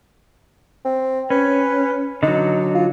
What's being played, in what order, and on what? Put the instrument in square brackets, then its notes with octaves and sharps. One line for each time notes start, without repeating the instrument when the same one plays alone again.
[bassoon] C4
[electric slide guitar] C#4 [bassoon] B4
[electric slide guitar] D3 F#3 [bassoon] D#4
[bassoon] F4